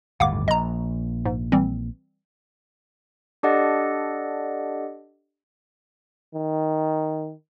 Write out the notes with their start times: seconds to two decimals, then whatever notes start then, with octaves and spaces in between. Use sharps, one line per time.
0.20 G1 D#2 A2 F5 F#5 D6
0.48 A#1 D#5 A#5
1.26 G#2
1.52 E3 G3 C4
3.43 D4 G4 A4 D5 D#5 F#5
6.34 D#3